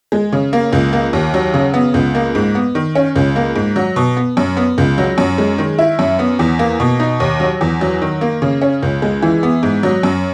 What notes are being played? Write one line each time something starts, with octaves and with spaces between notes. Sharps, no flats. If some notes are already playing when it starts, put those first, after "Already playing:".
G#3
C#3
A#3
C#2
A#3
D#2
F#3
C#3
B3
C#2
A#3
G#2
B3
D#3
C#4
C#2
A#3
G#2
F#3
B2
B3
F#2
B3
C#2
F#3
F#2
G#3
D#3
E4
F#2
B3
E2
A#3
B2
D#4
D#2
F#3
E2
F#3
D#3
A#3
C#3
C#4
C#2
G#3
E3
B3
G#2
F#3
F#2